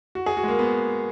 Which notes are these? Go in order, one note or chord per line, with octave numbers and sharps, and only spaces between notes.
F#4
G#4
F#4
G#3
A#3
B3